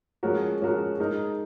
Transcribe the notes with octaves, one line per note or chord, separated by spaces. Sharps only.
F3 G#3 C#4 F#4 A#4
F3 G#3 C#4 F#4 A#4
G#3 D#4 A#4